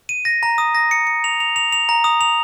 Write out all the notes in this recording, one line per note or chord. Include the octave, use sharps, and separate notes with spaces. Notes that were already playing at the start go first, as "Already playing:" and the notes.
D#7
A#6
A#5
D#6
A#6
C#7
C#7
F7
F7
F7
F7
A#5
D#6
F7